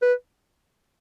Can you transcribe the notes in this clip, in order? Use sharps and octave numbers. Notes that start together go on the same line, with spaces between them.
B4